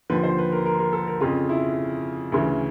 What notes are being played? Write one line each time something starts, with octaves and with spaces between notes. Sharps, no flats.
D#2 D3 F3 B4
C5
B4
A#4
A#4
A#4
A4
A#4
F2 C#3 F3 F4
E4
D2 C#3 E3